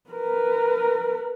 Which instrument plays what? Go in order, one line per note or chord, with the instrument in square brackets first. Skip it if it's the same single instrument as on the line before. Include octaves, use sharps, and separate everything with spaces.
[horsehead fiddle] A#4 B4